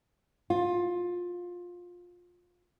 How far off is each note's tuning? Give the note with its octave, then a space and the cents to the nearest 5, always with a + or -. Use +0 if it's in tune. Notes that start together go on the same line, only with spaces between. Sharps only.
F4 +15